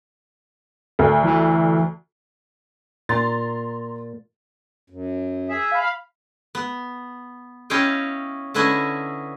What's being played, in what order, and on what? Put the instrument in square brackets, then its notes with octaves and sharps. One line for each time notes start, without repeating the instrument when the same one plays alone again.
[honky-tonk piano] D2
[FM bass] E3
[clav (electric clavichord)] A#2 [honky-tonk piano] A#5 C6 A6
[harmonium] F#2
[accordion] G#4 E5
[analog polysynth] F5 B5
[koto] B3
C#4 E4 C#5 D#5 F5 G5
D3 C#4 E4 B4 D#5 G#5